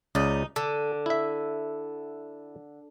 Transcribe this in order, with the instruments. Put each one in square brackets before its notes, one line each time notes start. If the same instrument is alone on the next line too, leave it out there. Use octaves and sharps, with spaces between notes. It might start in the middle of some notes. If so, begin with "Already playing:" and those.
[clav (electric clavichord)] C#2 C#3 D5 [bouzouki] D#4
[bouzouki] D3 [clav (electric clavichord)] A4
[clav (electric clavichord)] E4 E5